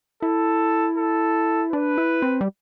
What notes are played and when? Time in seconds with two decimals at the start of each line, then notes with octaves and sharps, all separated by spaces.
0.22 E4 A4
0.97 A4
1.72 D4 B4
1.98 E4
2.22 C4
2.41 G3